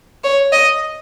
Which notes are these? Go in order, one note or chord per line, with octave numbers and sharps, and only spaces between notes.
C#5
D#5